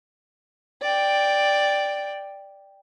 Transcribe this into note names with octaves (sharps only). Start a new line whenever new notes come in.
D5 G5